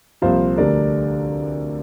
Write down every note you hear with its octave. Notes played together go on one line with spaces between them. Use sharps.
C2 A#2 F3 C5 F5
D2 D3 G3 A#4 D5